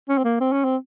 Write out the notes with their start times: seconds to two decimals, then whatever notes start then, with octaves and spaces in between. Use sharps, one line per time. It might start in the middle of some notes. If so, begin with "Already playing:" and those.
0.09 C#4
0.18 C4
0.24 A#3
0.40 C4
0.52 C#4
0.64 C4